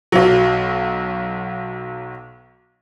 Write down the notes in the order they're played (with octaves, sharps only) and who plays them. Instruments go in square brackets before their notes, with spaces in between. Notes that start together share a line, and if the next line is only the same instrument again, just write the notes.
[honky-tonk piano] B1 F#3